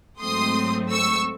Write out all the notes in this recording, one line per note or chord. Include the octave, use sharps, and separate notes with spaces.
G#2 F#3 A3 C4 C6 D#6
C#6 E6